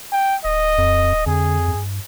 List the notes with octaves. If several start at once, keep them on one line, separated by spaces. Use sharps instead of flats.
G5
D1 D#5
F2
F2 D3 G#4
G2